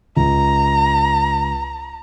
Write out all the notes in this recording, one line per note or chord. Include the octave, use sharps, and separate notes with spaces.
C#2 A#5